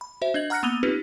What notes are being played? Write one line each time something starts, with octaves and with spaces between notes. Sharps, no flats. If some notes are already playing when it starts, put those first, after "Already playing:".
B5
F#4 C5 E5
D4 D#5 G#6 F#7
F#5 A#5 F6 F#6 A#6 C#7
A#3 B3 B5 D#7 F7 G7
C4 C#4 D#4 F4 G4 B4